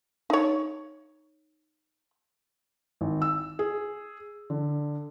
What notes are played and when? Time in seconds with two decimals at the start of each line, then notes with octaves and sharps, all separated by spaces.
0.30 D#4 C#5
3.01 G#1
3.22 E6
3.59 G#4
4.50 D3